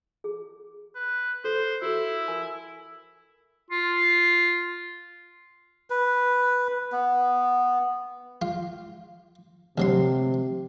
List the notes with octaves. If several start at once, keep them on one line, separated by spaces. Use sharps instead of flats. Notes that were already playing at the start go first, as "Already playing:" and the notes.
G#4
B4
A4 C5
E4 F#4 A4
A#4 G#5
F4
B4
B3
F4
D2 C3 F#3 C6